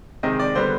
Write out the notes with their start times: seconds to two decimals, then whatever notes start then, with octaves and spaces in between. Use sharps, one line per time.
0.23 C3 D#3 G#3 C4 D#5
0.40 D5
0.55 D3 G3 B3 C5